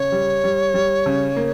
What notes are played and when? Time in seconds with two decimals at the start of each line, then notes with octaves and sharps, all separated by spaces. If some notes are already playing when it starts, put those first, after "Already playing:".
Already playing: C#3 C#5
0.12 G3
0.44 G3
0.74 G3
1.06 C#3
1.36 A#3